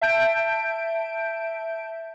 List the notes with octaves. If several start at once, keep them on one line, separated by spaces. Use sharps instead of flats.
E5 A5 G6 D7